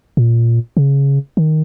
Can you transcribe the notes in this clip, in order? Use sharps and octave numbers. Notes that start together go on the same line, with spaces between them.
A#2
C#3
D#3